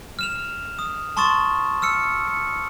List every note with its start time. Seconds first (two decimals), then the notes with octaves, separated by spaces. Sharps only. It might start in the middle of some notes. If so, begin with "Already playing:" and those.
0.19 F6 E7 F7
0.79 D#6
1.17 A5 C6 C#6 D#6 A6 E7
1.82 E6 F6 C#7
2.28 C#7